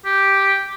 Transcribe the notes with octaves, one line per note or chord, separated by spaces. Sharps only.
G4